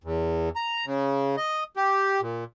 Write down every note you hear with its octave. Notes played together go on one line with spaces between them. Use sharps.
E2
A#5
C#3
D#5
G4
A#2